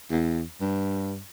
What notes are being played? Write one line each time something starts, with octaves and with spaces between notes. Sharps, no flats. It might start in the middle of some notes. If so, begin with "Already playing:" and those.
E2
G2